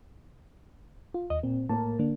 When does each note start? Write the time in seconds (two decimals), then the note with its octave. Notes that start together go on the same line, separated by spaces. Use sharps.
1.14 F4
1.30 D#2 D#5
1.43 A#2 C4
1.69 A2 A#3 A#4 A5
1.99 D3 A#3 D4